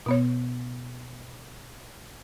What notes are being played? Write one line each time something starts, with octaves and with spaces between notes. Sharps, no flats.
B2 B3 C#5